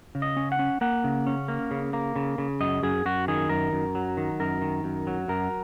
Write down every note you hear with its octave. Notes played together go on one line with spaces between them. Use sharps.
C#3
D#5
C#4
F#5
C#4
A#3 F#5
C#3
C#4
A#3
C#3
A#3
C#3
C#3
F#2 D#5
F#2 G#4
F#2 F#4
D#3 G#4
F#2 A#4
F#2
F#3
D#3
F#2 A#4
D#3
F#2
F#3
F#2 A#4